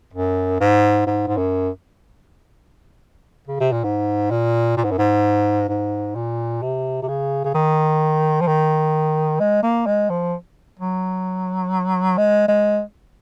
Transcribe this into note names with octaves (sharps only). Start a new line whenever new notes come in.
F#2
G#2
G#2
G#2
F#2
C#3
C3
A#2
G#2
A#2
A#2
G#2
F#2
G#2
G#2
A#2
C3
C3
C#3
C#3
D#3
F3
D#3
G#3
A#3
G#3
F3
F#3
G#3
G#3